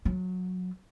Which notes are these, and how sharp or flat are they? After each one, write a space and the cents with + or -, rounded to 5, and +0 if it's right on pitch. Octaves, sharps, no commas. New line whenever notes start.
F#3 -15